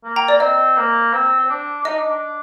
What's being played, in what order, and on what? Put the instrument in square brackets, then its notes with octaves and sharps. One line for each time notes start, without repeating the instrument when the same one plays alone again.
[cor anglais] A#3
[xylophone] G5 A#5
D5
[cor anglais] C4 [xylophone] D#5
[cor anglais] A#3
C4
C4
D4
D4
[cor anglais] D#4 [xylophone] D#5
[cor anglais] D4
D4